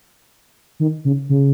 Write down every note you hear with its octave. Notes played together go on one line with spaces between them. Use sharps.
D#3
C#3
C#3